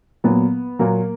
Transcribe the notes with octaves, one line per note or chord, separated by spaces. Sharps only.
A#2 F#3 B3
A#2 F#3 A#3